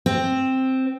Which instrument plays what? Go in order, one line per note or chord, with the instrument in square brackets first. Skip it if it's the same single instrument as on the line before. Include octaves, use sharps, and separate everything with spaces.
[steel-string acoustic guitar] C4